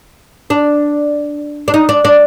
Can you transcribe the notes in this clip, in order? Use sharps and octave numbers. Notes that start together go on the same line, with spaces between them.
D4
D4
D#4
D4
D4